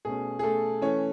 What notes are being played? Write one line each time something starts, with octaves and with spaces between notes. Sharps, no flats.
B2 A3 C#4 G#4
G#4
A3 A4
E3 A3 C#4 C#5